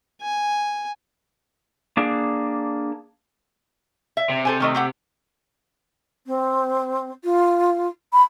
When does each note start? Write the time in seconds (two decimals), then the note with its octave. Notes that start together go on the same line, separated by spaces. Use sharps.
0.22 G#5
1.97 A#3 D4 G#4
4.17 E5
4.30 C3
4.45 A4 C5 G#5
4.60 D#3 A3 D#5
4.75 A3 G4 F#5
6.27 C4
7.24 F4
8.13 B5